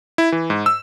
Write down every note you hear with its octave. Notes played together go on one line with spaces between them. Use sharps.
E4
E3
G#2
E6